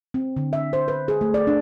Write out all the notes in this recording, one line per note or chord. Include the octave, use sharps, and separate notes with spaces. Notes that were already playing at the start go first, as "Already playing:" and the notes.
C4
D3
E5
C5
B4
G#4
A3
D5
D4